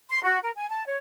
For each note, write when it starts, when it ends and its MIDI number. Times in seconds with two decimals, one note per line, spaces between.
0.10 0.22 84
0.23 0.38 66
0.43 0.51 70
0.55 0.68 80
0.70 0.85 81
0.85 0.97 73